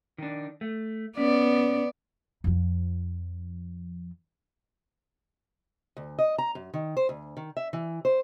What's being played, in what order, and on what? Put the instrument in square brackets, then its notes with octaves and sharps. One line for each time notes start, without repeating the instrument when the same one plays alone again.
[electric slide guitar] D#3 D4
A3
[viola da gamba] B3 D5 [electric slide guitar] C#4
[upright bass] F2 F3
[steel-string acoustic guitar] D2
D#5
A#5
F#2
D#3
C5
D2
D#3
E5
E3
C5